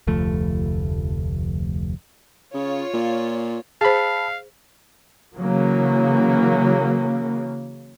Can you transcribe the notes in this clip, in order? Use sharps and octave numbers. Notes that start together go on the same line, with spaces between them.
F1 D2 F3 A3
C#3 F4 C#5
A#2
G#4 C5 F5 A5 B5
C#3 E3 F#3 A#3